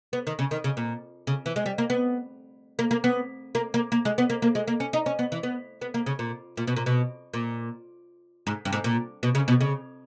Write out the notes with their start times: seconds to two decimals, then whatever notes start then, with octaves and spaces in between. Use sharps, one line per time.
0.13 B3
0.27 D#3
0.39 C#3
0.51 D#3
0.64 C#3
0.77 A#2
1.27 C#3
1.46 E3
1.56 G#3
1.66 G3
1.78 A#3
1.90 B3
2.79 A#3
2.91 A#3
3.04 B3
3.55 A#3
3.74 A#3
3.92 A#3
4.05 G#3
4.18 B3
4.30 A#3
4.42 A#3
4.55 G#3
4.68 A#3
4.80 C#4
4.93 D#4
5.06 C#4
5.19 B3
5.32 E3
5.43 B3
5.81 B3
5.94 A#3
6.06 C#3
6.19 A#2
6.57 A#2
6.67 B2
6.76 A#2
6.86 B2
7.34 A#2
8.47 G#2
8.65 G2
8.73 G#2
8.84 A#2
9.23 B2
9.35 C#3
9.48 B2
9.61 C#3